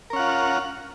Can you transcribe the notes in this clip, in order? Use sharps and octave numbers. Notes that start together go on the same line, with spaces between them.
C#4 F4 A#4 F#5